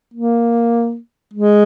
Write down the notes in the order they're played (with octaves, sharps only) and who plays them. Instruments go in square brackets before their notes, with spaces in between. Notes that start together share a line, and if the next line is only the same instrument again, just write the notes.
[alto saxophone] A#3
G#3